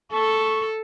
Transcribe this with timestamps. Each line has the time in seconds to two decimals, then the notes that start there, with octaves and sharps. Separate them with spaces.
0.12 A4 A5 C#6